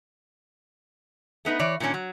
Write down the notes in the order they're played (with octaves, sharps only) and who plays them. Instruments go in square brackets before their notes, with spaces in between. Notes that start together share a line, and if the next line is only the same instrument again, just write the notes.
[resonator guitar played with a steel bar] A3 B3 D#4 B4
E3 C#5 D5
A#2 D#3 A3 C#4 D4
F#3